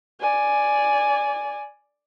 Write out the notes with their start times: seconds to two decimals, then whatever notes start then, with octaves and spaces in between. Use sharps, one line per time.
0.20 D5 G#5